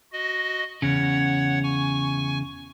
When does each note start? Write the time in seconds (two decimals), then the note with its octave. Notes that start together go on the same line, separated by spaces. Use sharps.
0.12 F#4 D#5
0.82 E2 C#3 C#5 F#5
1.63 G#5 C#6